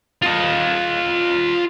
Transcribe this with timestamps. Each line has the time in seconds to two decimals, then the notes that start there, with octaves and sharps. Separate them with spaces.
0.22 F4 D#5